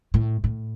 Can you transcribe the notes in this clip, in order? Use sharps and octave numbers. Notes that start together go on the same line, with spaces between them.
A2
A2